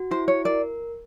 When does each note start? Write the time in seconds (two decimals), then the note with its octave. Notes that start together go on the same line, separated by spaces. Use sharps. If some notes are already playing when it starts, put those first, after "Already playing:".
Already playing: F#4
0.11 E4 C5
0.28 C#5
0.45 A#4 D5